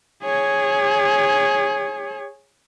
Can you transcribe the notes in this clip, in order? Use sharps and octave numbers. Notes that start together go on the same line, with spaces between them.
G#4 C#5